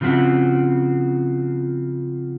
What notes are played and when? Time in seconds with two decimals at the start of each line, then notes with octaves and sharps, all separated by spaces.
0.01 C#3 F3 C4 F#4 E5